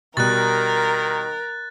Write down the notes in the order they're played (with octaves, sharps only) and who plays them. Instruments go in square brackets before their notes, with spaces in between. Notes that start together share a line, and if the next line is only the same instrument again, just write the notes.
[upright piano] B2 G3 [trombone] D#3 [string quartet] A#4 [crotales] F#6 A6